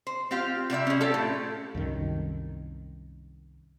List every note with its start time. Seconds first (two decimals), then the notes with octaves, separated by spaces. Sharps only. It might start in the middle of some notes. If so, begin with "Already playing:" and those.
0.07 C5
0.31 C4 F4 G4 F5
0.70 C3 G3 D5 E5
0.87 C#4 G#4
1.01 C4 F4 G4 A4
1.14 A2
1.75 C2 F#2 D#3